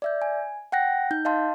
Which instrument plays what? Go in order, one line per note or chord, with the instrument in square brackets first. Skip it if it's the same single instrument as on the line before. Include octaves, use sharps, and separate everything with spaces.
[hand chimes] D5 E5 G6
G#5
F#5 G5 F#6 A#6
D#4 G6
D#5 F5 A5 C6